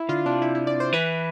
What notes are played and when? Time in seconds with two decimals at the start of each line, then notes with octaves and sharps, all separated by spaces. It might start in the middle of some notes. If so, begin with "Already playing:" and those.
Already playing: E4
0.09 D3 F4
0.26 C3 D4
0.42 E4
0.55 E4
0.67 D5
0.80 C5
0.93 E3 B4